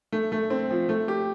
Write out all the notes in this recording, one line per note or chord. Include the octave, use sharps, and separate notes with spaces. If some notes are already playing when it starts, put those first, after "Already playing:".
A3
A3
C4
F3
A3
G4